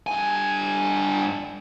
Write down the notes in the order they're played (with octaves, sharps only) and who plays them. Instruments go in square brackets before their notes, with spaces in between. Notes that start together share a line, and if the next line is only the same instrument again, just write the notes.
[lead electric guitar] G2 G#5